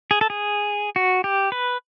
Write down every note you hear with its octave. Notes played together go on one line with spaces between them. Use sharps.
G#4
A4
G#4
F#4
G4
B4